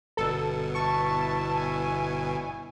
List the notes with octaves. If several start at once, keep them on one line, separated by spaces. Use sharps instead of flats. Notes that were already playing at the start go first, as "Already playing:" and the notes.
G1 B2 A4
E4 A5 C#6
G#5